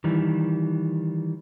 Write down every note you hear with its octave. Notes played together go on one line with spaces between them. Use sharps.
D#3 E3 G3